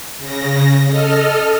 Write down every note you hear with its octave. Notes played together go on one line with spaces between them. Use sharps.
C#3 A#6
A4 D#5 F6